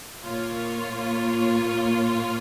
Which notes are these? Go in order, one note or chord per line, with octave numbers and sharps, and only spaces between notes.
A#2 A#3 F4 C#5